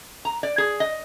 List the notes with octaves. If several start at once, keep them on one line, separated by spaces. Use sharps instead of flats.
A#5
D5
G#4
D#5